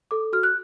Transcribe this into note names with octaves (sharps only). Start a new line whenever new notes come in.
A4 D6
F#4 F6
F#6